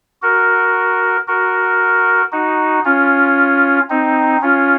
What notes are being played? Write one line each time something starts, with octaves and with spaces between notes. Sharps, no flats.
F#4 A#4
F#4 A#4
D#4 F#4
C#4 F4
C4 D#4
C#4 F4